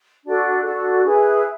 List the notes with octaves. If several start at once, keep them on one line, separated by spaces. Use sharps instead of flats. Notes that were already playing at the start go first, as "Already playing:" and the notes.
D4 F#4 A4
D4 F#4 A4
E4 G#4 B4